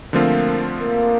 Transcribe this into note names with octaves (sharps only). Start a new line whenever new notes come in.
D3 F3 A3 A#3 C4 F4
A#3